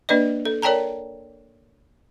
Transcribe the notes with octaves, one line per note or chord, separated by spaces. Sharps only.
A#3 D4 B4 D5 D#5
A4
A#4 C#5 D5 G5 A5 A#5